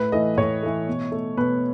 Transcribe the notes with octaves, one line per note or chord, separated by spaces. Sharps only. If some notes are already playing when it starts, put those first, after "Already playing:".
Already playing: A2 B4
E3 A3 D#5
A2 C#5
E3 A3
B2
A3
B2 B4